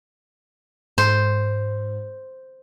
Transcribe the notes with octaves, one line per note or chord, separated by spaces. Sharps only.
G#2 C5